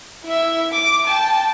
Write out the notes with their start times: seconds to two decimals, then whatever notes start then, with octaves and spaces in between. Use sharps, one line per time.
0.24 E4 E5
0.73 D6
1.06 G5 A5